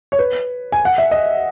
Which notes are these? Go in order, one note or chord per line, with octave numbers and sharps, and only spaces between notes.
C#5
B4
G#5
F#5
E5
D#5